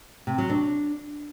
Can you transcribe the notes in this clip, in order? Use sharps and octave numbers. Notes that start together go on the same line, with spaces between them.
C3
F#3
D4